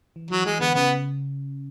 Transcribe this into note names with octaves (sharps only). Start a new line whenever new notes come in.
E3
E3 F#3
E3 G#3
D3 B3
C#3 B3